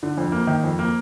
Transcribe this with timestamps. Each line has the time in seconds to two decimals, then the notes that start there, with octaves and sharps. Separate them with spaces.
0.03 D3
0.18 F2
0.32 A#3
0.47 D#3
0.64 F2
0.79 A#3